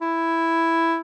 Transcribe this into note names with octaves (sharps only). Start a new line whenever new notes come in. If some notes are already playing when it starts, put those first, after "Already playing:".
E4